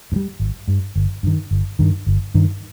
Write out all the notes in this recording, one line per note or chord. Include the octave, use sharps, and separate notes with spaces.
G2
G3
G#1
G2 G3
G1
G2 D#3
G1
G2 D#3
G1
G2 D#3